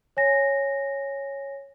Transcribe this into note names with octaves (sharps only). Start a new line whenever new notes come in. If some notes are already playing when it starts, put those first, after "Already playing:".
C#5 G#5 A#6